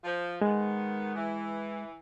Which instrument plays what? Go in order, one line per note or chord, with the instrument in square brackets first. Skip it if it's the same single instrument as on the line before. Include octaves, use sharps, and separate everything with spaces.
[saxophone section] F3
[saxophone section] D#3 B3 [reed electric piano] G#3
[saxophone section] E3